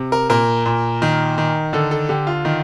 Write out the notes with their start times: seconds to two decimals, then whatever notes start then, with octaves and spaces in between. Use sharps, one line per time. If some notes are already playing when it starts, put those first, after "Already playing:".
Already playing: C3
0.12 A#4
0.29 A#2 A#4
0.66 A#2
1.02 D#3
1.38 D#3
1.73 D3 A4
1.91 A4
2.09 D3 G4
2.27 F4
2.45 D#3